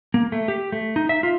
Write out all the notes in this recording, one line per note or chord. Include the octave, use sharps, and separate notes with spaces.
A#3
A3
G4
A3
D#4
E5
F4